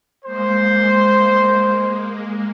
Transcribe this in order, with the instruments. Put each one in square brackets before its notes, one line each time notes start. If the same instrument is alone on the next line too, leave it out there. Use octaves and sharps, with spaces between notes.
[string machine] G#3 A#3 [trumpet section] C5